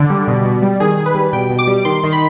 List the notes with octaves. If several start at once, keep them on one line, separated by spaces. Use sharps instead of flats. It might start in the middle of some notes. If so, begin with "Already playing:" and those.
Already playing: D3 D5
G3
B2
B2
G3
D#3 G#4
D#3
B4
G3
B2 G5
B2
D6
G3
D#3 C6
D#3
B5